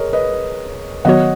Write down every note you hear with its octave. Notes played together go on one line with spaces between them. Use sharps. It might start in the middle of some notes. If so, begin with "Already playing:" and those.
Already playing: G#4 A#4 C#5 D#5
B4 D#5
D#3 F#3 B3 F#4 C#5 D#5 F#5